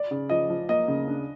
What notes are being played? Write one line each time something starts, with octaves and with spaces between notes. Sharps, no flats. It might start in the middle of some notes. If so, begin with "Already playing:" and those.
Already playing: D5
C#3
F3 D#5
F3
A#3 D#5
C#3
D4